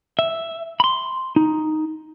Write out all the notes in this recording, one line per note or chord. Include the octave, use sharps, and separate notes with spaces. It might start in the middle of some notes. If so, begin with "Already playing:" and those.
E5
B5 C6
D#4